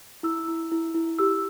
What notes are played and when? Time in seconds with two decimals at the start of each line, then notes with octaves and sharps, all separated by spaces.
0.23 E4 E6
0.48 E4
0.72 E4
0.95 E4
1.19 G4 E6